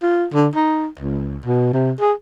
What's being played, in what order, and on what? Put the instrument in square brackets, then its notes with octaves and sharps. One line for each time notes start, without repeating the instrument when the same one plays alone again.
[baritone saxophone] F4
D3
D#4
C#2
B2
C3
G#4